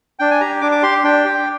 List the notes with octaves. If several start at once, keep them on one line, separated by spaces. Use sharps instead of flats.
D4 G5
G#5
G4 A#5
D4 D6
D6
G4 C6
D4 G5
G4